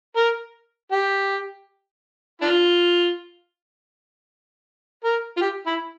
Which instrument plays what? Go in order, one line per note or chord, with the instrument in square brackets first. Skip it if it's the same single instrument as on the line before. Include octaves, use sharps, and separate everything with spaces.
[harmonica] A#4
G4
D4 F4
A#4
F4
G4
E4